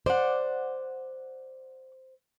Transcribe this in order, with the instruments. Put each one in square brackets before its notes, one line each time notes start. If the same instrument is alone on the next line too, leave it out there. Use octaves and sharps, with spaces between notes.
[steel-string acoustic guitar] C5 [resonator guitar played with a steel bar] D5 F#5